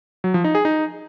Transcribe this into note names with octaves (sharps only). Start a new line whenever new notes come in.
F#3
F3
D#4
G#4
D#4